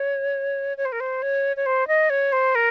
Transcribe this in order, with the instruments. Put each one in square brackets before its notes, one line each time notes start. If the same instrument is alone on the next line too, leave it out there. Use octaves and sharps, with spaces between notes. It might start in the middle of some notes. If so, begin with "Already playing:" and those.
Already playing: [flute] C#5
C#5
C5
A#4
C5
C#5
C#5
C5
D#5
C#5
C5
A#4